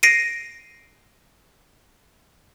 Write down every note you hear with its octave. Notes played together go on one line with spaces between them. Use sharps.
A#6 C7 D7 D#7